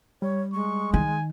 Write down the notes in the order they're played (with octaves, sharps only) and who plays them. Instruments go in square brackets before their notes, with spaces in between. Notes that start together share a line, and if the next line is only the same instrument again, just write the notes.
[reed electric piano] G3 [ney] C#5
[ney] G#3 [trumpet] C#6
[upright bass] D#3 [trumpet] G#5